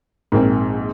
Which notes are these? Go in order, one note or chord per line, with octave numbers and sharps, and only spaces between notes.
A#1 G#2 A#3 C4